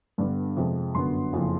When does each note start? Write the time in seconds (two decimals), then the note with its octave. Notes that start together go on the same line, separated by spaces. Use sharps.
0.18 G2 D3 G3 B3
0.56 F2 C3 F3 G#3
0.95 G1 F#2 D3 F#3 B3 C6
1.33 F#1 F2 C#3 F3